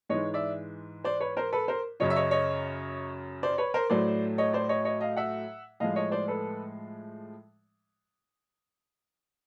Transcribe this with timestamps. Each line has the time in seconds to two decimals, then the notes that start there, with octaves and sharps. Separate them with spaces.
0.09 G#2 E3 G#3 C#5 D#5
0.34 D5 E5
1.04 C5 D5
1.20 B4 C#5
1.37 A#4 C5
1.52 A4 B4
1.68 A#4 C5
2.00 F#2 C#3 F#3 C#5 D#5
2.10 E5
2.16 C#5 D#5
2.31 C#5 D#5
3.43 C5 D5
3.58 B4 C#5
3.74 A#4 C5
3.90 A2 F#3 A3 C5 D5
4.38 C#5 D#5
4.53 C5 D5
4.69 C#5 D#5
4.85 C#5 D#5
5.01 D#5 F5
5.16 E5 F#5
5.80 A2 F3 G#3 D#5 F5
5.96 C#5 D#5
6.11 C5 D5
6.28 A4 B4